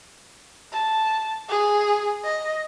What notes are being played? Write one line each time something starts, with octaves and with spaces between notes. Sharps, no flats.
A5
G#4
D#5